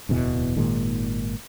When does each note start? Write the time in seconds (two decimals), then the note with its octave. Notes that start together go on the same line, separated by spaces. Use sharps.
0.09 D1 E2 B2 E3
0.56 G#1 A#2 D#3 G#3